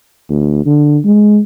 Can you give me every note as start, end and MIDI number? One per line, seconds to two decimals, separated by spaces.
0.29 0.66 38
0.66 0.98 50
1.05 1.40 56